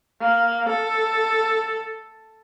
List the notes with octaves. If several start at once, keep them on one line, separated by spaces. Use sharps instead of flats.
A#3
A4